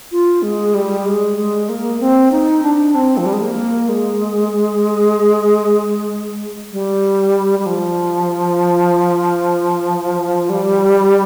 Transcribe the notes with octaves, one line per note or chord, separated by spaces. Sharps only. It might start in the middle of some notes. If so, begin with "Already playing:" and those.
F4
G#3
G3
G#3
G#3
A#3
C4
D#4
D4
C4
F3
G3
G#3
A#3
G#3
G3
G3
F3
G3